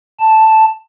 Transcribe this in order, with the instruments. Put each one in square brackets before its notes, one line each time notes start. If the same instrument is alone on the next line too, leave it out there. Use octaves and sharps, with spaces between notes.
[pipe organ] A5